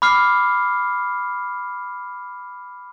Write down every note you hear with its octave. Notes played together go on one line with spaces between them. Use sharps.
B5 D6 F6 C7